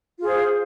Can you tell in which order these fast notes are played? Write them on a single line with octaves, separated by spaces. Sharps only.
F4 G#4 C5